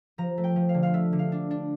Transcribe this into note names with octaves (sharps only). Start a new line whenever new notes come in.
F3 A#5
A3
G5
F3
F5
D3
F5
A3 E5
D3
F5
D4
D4